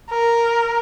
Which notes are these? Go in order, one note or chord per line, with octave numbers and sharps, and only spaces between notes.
A#4